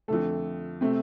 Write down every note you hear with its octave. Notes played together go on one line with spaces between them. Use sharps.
F2 D3 A3 A4
C3 A3 C4